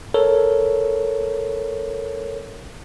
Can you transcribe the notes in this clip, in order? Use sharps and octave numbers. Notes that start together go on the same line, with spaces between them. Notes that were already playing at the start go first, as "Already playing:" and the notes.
A4 A#4 C#5